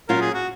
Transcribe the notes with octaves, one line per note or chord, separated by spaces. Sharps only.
A#2 F#3 C#4 F4 A#4
G#4
F#4